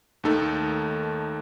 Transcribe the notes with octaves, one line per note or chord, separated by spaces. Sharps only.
D#2 D#3 A3 D#4 A4